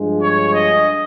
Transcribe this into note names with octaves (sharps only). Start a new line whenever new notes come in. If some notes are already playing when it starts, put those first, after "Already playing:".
Already playing: G2 F3 G#3
C#5
D#5